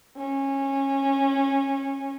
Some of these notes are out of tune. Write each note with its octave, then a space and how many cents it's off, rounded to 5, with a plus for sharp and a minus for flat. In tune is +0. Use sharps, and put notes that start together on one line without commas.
C#4 -20